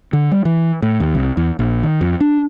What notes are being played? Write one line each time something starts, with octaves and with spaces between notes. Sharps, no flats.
D3
G3
E3
A2
D#2
C2
E2
A#1
D#3
F2
D4